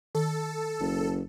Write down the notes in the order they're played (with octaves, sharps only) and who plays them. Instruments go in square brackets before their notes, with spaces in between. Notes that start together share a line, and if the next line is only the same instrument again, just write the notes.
[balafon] D#3 [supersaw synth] A4
[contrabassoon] F#1